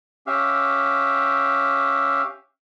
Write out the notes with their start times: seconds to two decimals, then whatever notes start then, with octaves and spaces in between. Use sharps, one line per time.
0.27 C#4 G4 E5 F5